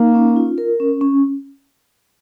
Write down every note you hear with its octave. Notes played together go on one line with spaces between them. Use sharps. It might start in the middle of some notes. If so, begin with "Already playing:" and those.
Already playing: A#3 D#4
C#4
F4
A#4
C#4
C#4